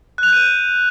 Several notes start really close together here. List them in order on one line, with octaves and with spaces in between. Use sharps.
F#6 F7 G6 D#7